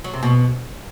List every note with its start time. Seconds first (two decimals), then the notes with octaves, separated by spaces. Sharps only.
0.04 F#3
0.13 C3
0.23 B2